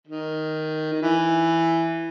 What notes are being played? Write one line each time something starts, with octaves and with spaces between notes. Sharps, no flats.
D#3
D#3
E3